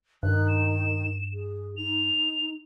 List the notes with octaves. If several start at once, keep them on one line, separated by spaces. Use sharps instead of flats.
G2 D#3 F#6
E7
G#4
D#4 F7